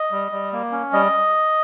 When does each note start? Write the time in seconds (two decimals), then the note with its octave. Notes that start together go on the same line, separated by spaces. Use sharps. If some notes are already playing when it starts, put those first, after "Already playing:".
Already playing: D#5
0.12 G3
0.32 G3
0.53 A#3
0.72 C#4
0.93 G3 D#5